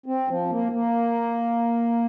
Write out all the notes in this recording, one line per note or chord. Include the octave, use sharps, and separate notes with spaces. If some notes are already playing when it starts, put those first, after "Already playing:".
C4
F3
A#3
A#3